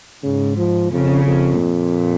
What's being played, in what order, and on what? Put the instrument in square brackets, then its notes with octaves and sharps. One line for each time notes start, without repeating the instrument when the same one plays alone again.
[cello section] G#2 [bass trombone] C#3
[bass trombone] F3
[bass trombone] F2 [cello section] C#3
[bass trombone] F2
[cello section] A#2